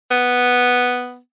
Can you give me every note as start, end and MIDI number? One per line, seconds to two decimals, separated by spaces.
0.11 1.18 59